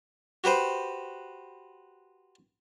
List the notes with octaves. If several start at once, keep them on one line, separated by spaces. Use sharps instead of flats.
F#4 G4 B4 C5